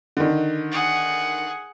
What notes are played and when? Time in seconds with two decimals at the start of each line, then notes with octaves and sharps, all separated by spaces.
0.17 D3 D#3
0.71 G#4 F#5